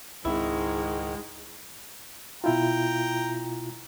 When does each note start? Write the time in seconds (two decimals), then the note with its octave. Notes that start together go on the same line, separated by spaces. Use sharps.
0.25 C#2 G#2 D#3 G#3 C4 E4
2.44 B2 E4 F4 G5 A#5